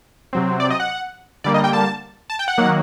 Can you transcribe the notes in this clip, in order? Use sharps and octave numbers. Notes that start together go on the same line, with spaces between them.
C3 F#3 C4
D5
D#5
F#5
D3 G3 A#3 D5
D#5
G5
A5
A5
G5
F#5
D#3 F#3 A#3